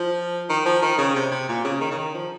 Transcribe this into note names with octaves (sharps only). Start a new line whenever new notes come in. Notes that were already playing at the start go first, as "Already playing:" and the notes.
Already playing: F3
D#3
F3
D#3
C#3
C3
C3
A#2
C#3
D#3
C#3
D#3
F3